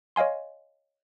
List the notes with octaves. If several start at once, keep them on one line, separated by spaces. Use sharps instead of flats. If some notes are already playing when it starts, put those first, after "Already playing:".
C#5 D#5 F5 G#5 C6